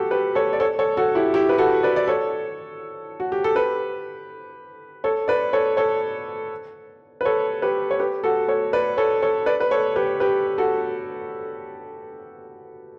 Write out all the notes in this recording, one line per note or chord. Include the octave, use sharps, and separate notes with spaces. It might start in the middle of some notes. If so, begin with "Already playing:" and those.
Already playing: F#4 G4 A4
G4 B4
A4 C#5
D5
A4 C#5
A4 C#5
F#4 A4
E4 G4
E4 G4
B4
F#4 A4
B4 D5
D5
A4 C#5
F#4
G4
A4
G4 B4
A4 C#5
B4 D5
A4 C#5
A4 C#5
B4
A4 C#5
G4 B4
C#5
G4 B4
F#4 A4
A4 C#5
B4 D5
A4 C#5
A4 C#5
B4 D5
B4
A4 C#5
G4 B4
G4 B4
F#4 A4